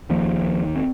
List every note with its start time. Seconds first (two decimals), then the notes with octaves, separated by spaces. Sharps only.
0.10 D#2 F3 A#3
0.76 C4